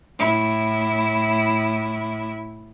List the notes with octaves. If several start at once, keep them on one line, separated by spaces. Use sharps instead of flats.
A2 E4